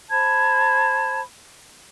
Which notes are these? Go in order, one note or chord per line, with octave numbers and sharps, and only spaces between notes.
C5 A5 B5 G#6